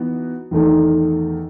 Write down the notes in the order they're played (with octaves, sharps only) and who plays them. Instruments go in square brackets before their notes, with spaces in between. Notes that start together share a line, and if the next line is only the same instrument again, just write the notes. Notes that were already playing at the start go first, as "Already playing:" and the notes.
Already playing: [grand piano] E3 B3 D#4 F#4
E2 D#3 A3 D#4 A4